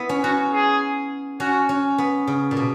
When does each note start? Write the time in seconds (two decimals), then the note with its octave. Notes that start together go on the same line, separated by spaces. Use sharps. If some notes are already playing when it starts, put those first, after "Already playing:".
Already playing: B3 E4
0.09 C#4
0.23 C#4 F#4
0.53 G#4
1.40 C#4 F#4
1.69 C#4
1.98 B3
2.27 C#3
2.51 A#2
2.57 B2